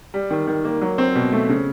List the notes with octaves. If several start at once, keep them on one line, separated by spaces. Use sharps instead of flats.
G3
D#3
D#3
A#3
F#3
C4
B2
A3
C#3